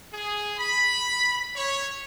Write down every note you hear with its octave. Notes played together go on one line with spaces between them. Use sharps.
G#4
B5
C#5